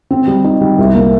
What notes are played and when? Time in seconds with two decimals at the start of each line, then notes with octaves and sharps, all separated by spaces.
0.11 C4
0.27 G3
0.44 D#4
0.61 G3
0.79 C2
0.95 A#3